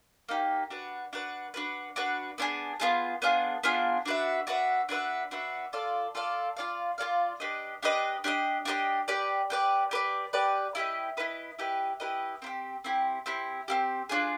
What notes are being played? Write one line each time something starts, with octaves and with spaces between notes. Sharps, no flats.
A#3 D#4 G4
D4 F#4 B4
D4 F#4 B4
D4 F#4 B4
D4 F#4 B4
B3 D4 F4 G#4
B3 D4 F4 G#4
B3 D4 F4 G#4
B3 D4 F4 G#4
D4 F#4 B4 E5
D4 F#4 B4 E5
D4 F#4 B4 E5
D4 F#4 B4 E5
F4 A4 D5 F5
F4 A4 D5 F5
F4 A4 D5 F5
F4 A4 D5 F5
D4 G4 B4 D#5
D4 G4 B4 D#5
D4 G4 B4 D#5
D4 G4 B4 D#5
G4 B4 D5
G4 B4 D5
G4 B4 D5
G4 B4 D5
E4 G4 B4 D#5
E4 G4 B4 D#5
E4 G4 B4 D#5
E4 G4 B4 D#5
C4 E4 G4
C4 E4 G4
C4 E4 G4
C4 E4 G4
D4 F4 G#4